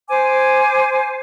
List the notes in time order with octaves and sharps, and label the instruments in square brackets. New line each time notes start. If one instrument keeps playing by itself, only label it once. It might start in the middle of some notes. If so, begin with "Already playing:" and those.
[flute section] C5 G#5 D6